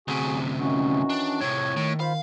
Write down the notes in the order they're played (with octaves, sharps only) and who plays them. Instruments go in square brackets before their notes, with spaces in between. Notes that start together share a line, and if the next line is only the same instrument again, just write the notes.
[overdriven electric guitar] D2 C3 [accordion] F#4 G#4
[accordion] D#3 E3 F#4 [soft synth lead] C#4
[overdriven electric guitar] D4
[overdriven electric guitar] A2 C3 [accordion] C#5 [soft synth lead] G#6
[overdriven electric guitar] A2 [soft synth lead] D#3
[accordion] F4 C5 B5 [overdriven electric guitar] F5